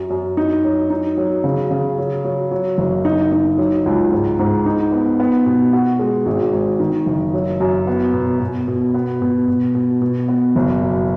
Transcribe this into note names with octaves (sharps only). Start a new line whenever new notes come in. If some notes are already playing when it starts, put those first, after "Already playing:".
Already playing: F#2
F#2
D#4
F#3
D#4
F#3
C#3
C#3
F#3
F#3
F#3
F#1
D#4
D#4
F#3
C#2
G#2
G#2
D#4
B3
B3
B2
F#4
G#3
G#1
G#1
D#3
F#1
F#3
F#2
B3
B2
B2
B2
B3
B2
B2
B2
B2
B3
F#1
F#2